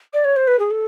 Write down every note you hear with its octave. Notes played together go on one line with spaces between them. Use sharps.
D5
C#5
C5
B4
G#4
A4